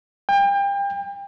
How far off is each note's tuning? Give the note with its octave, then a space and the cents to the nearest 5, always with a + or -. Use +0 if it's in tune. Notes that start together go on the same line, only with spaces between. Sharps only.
G5 +35